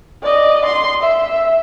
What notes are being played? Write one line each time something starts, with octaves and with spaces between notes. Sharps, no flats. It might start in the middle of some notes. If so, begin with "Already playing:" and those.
D5 D#5
C6
E5